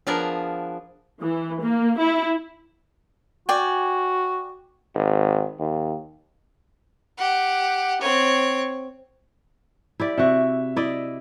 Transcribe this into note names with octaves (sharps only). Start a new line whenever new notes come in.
F3 B3 D4 G#4 A#4
E3
A#3
E4
F#4 D5 G5 G#5
G#1
D#2
G4 F#5
C4 C#5
E4 G4 D5
C3 F#4 E5
E4 D5 D#5